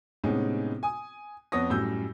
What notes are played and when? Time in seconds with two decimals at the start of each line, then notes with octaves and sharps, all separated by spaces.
0.24 A2 C3 G#3 B3 C#4 D#4
0.83 G#5 D#6
1.52 F2 B3 C#5 D#6 A#6
1.70 F#2 A2 G3 E6 G6